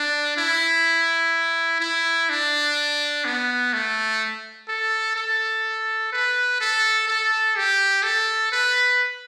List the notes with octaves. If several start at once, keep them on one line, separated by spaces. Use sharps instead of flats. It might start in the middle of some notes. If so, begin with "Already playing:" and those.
Already playing: D4
E4
E4
D4
B3
A3
A4
A4
B4
A4
A4
G4
A4
B4